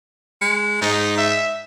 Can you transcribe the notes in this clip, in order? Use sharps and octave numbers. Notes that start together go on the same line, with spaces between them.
G#3
G#2 D#4
E5